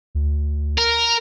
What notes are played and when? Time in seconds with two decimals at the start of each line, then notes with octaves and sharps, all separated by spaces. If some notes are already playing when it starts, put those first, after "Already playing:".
0.15 D2
0.78 A#4